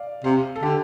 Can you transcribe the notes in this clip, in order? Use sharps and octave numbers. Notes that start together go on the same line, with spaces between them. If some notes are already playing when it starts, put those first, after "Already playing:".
Already playing: D5 F5
C3 F5
A4
D3 G4